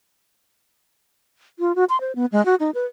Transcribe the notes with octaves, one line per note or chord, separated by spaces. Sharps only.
F4
F#4
C6
C5
B3
G#3
F#4
D#4
B4